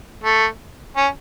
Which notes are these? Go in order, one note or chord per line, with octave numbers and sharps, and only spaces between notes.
A3
C#4